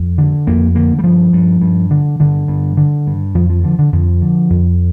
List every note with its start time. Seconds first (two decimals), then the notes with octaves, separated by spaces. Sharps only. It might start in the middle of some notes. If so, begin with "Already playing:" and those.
Already playing: F2
0.18 D3
0.47 F2 A#3
0.75 D3 A#3
0.99 G3
1.04 G2 F3
1.33 G2
1.62 G2
1.91 D3
2.20 G2 D3
2.48 G2
2.77 D3
3.07 G2
3.35 F2 F3
3.50 F3
3.63 D3 F3
3.79 D3
3.93 F2 F3
4.22 D3
4.50 F2